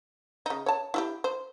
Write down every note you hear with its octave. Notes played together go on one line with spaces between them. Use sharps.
C#3 D#4
C#5 A5
E4 F#4 G4
C5